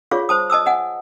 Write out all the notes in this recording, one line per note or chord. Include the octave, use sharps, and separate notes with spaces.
F4 G#4 C#5 D5 F5 C#6
C5 A5 D#6
D#5 A5 D#6 E6
D#5 F#5 G#5